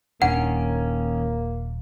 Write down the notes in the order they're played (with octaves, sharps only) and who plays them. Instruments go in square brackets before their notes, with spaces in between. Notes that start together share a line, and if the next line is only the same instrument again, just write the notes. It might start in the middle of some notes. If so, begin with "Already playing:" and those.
[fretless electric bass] D#1 D4 [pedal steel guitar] D#3 C#4 [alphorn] A#3 [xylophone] F#5